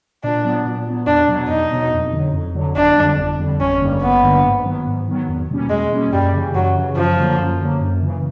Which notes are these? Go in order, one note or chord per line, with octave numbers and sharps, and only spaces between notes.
A#2 D4
F#3 B3
A#2
F#3 B3
E2 D4
B2 F#3 B3
E2 D#4
B2 F#3 B3
F2
D3 F#3
F2
D3 F#3
G1 D4
F2 D3 G3
G1
F2 D3 G3
G#1 C#4
G2 D3 G3 A#3
G#1 B3
G2 D3 G3 A#3
G#2
D#3 F#3 B3
G#2
D#3 F#3 B3
E2
B2 G3 A#3 C#4
E2 G#3
B2 G3 A#3 C#4
F#2 G3
C#3 E3
F#2 F#3
C#3 E3
F#2 F3
D3 F#3 A#3
F#2
D3 F#3 A#3
F#2
C#3 E3